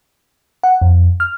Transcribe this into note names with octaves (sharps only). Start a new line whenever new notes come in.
F#5
F2
F6